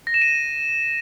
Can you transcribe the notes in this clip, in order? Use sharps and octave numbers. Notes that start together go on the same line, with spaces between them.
A#6
E7
D#7